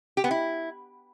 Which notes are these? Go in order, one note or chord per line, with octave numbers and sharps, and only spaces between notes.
G4
B3
E4